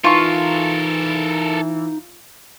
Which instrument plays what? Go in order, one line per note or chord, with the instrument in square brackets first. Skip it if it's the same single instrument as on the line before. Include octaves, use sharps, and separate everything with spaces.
[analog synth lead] E3 [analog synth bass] D#4 [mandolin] F4 C#6 [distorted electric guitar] A4 A#4